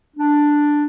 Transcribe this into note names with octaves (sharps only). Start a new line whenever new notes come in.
D4